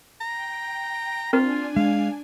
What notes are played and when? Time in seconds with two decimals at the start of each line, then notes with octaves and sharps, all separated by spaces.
0.21 G5 A#5
1.33 C4 D4 F4 A#4 G#5
1.76 G#3 F5